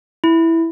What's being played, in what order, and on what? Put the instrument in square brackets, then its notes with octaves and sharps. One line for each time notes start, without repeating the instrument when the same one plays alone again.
[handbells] E4